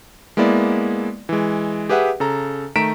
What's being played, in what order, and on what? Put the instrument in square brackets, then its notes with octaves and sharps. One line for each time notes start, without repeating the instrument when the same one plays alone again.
[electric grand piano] G#3 A#3 B3 E4 D5
E3 G#3
G4 G#4 B4 E5 F#5
C#3 A4 A#5
D#3 A3 A#5 B6 D7 E7